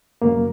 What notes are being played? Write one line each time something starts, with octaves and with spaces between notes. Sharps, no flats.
F#2 C#3 F#3 A#3